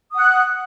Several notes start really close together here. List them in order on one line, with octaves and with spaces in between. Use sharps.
D#6 F#5 F#6